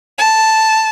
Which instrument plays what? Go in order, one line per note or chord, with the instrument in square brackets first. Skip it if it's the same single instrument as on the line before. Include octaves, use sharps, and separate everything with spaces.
[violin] A5